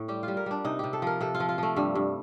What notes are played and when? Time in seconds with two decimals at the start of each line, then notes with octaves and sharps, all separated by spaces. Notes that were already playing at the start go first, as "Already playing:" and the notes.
Already playing: A2
0.08 G3 G4
0.23 F4
0.28 G3
0.37 A#4
0.46 G3 D4
0.65 C3 D#4
0.79 C3 G4
0.93 A4
1.02 F3 A#4
1.21 C3 A4
1.35 F4
1.40 F3
1.49 F4
1.58 F3 A3
1.76 G2 G3
1.95 G2